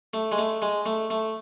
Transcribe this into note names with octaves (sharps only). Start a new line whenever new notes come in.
A3
G#3
A3
G#3
A3
A3